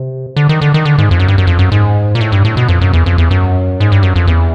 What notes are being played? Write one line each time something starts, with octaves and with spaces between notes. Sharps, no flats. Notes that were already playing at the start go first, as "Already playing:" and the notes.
Already playing: C3
D3
D#3
D3
D#3
D3
G#2
F2
F#2
G2
F#2
F2
F#2
G#2
A#2
A2
G2
A2
B2
F2
F#2
E2
F2
E2
F#2
G#2
G2
F#2
F2
E2